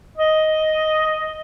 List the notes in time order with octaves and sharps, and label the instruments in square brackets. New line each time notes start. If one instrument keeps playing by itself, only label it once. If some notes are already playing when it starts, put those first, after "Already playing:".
[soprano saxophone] D#5